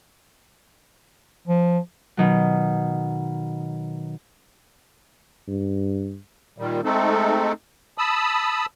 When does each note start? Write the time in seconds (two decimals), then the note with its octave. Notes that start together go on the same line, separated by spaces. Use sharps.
1.48 F3
2.17 B2 D#3 F#3
5.48 G2
6.58 A#2 D#3 G3
6.84 G#3 A3 C4 D#4 A4
7.98 A5 B5 D#6 E6